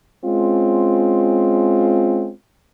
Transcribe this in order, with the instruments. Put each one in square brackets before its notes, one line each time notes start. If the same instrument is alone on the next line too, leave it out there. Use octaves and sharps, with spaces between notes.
[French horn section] G#3 C4 C#4 F4